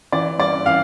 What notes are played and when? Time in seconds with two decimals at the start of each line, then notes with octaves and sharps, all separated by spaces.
0.12 E3 D5
0.39 G2 D5
0.66 E3 F5